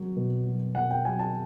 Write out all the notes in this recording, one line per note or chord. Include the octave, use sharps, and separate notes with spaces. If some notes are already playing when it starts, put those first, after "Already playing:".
Already playing: F#3
B2
F#3
B2 F#5
G5
F#3 G#5
A5